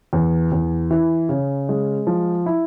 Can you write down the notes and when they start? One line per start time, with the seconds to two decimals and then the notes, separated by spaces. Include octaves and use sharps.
0.13 E2
0.52 E2
0.91 E3
1.29 C#3
1.69 G#3
2.07 F3
2.46 E4